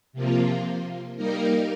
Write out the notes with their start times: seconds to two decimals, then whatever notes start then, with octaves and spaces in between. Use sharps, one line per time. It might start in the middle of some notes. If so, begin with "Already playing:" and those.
0.13 C3 F3 A#3 F4
1.16 G3 A#3 D#4 A#4